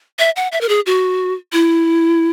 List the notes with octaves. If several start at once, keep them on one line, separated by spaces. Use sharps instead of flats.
E5
F#5
E5
A#4
G#4
F#4
E4